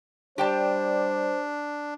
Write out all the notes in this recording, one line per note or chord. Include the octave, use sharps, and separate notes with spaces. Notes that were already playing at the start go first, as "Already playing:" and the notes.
G3 D4 G4 C5 G5 A5